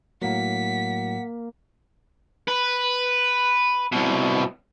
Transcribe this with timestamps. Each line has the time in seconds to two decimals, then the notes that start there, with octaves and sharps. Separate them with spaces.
0.22 A2 F#3 A#3 F#5 B6
2.48 B4
3.92 C2 B2